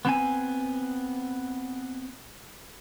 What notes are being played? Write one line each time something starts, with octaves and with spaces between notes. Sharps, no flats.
B3 C4 G#5